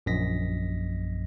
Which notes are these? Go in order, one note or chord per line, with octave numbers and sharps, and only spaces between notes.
A#1 F#2 A#2 D#5 A#6 B6